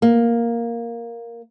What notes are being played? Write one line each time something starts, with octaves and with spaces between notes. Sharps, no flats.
A#3